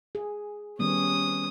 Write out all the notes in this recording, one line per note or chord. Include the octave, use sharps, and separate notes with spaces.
G#4
D#3 G3 B3 C#4 D#6